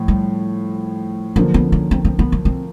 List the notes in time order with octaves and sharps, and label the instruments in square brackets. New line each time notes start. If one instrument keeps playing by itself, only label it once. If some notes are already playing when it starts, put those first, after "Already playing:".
Already playing: [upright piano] A2 F3
[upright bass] G3
[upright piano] D3 F3 A#3 [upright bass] F#3
[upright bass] B3
C#4
C4
C4
B3
F#3
C4